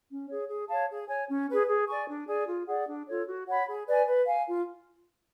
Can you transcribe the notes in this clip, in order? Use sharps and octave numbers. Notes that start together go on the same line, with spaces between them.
C#4
G#4 C#5
G#4
C#5 F5 A5
G#4
C#5 G#5
C#4
G#4 B4
G#4
D5 G#5 C#6
D4
G#4 D5 G#5
F4
G#4 D5 F#5
D4
F4 A4 C#5
F#4
C#5 F#5 B5
G#4
B4 D5 G#5
B4
F5 G#5
F4